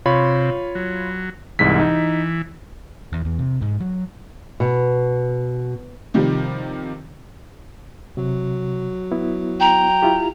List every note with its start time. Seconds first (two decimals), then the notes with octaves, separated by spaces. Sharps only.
0.06 C3 F4 C#5 B5
0.75 F#3
1.59 C2 G#2 E3 B6
1.79 D#4
3.13 E2
3.25 E2
3.39 C3
3.61 G#2
3.80 F#3
4.60 B2
6.14 C3 D#3 F3 G3
8.17 C3 F#3
9.12 B3 E4
9.60 G5 A#5
10.02 E4 F4 G4